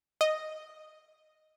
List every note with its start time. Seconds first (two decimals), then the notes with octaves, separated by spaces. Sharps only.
0.21 D#5